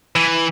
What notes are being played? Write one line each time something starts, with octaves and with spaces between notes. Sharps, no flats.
E3